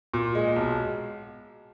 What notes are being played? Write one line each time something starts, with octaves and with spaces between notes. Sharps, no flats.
A#2
G#3
B1